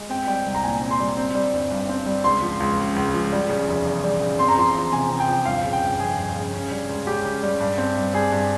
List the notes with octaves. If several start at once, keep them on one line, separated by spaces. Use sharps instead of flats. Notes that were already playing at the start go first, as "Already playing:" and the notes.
Already playing: G#3
C4 G5
G3 G5
C2
A#5
A#2 G#5
C4
C6
G3
C4
G3
G1
G2
C4
G3
C#2 C6
F3
C#2
C#3
C#2
F3
G3
C#3
F1
E2
G3
C#3
C4 C6
A#5
F3 C6
E2
C3 G#5
C4
G5
F3
G1 F5
C#3
G5
G1
F2 G#4
G1
C#3
C#4
G3
C#2
C#3 G4
C#4
G3
G2
C4
G2
G3 G#4
G2